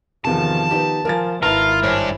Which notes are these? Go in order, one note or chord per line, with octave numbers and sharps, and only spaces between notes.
E2 C3 D#3 F3 A5
B3 D#4 G4
F3 A#4 G#5 A6
G#1 E4 F4 A#4 B4 A5 F6
G2 D4 C5 C#5 G#5